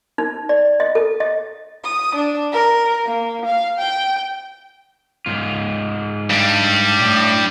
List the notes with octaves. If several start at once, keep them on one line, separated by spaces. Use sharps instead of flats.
D#4
D5
D#5
A4
D#5
D#6
D4
A#4
A#3
F5
G5
G#2 F4
G2 G3
A2